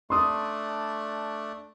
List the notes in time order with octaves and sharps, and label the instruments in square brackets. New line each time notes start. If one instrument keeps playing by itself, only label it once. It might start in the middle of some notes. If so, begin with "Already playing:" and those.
[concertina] A3 D4 [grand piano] C6 D#6